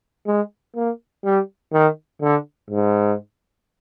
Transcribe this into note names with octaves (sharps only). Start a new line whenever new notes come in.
G#3
A#3
G3
D#3
D3
G#2